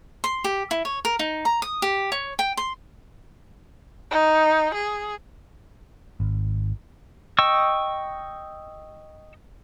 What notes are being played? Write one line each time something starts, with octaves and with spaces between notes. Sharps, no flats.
C6
G4
E4
C#5
A#4
D#4
A#5
D#6
G4
C#5
G5
C6
D#4
G#4
G#1
D#5 G5 C#6 E6